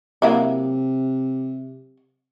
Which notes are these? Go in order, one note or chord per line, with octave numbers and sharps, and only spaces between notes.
C3 F#3 A#3 E4